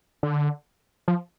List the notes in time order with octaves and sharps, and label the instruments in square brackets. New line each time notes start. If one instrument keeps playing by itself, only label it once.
[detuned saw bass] D3
F3